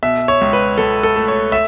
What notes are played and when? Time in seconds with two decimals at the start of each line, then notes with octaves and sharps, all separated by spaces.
0.03 B2 E5
0.28 C#5
0.41 C#2
0.53 B4
0.78 C#2 A4
1.03 A4
1.16 A3
1.28 C#5
1.52 E5